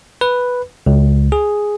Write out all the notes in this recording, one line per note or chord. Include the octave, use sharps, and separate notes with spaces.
B4
C#2
G#4